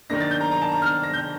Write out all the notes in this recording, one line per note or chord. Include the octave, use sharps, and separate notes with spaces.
D#3 A#3 D4 A#6
A6
G6
A#5
A#5
A5
A#5
F6
A#6
G6